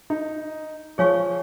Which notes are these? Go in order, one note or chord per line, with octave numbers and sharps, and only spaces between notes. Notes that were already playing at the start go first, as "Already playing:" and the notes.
D#4
F3 G#4 C#5 F5 G#5 C#6